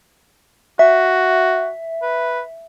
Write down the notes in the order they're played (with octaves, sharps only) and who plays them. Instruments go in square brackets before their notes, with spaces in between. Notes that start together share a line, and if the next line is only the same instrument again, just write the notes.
[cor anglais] F#4 [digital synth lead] E5
[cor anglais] B4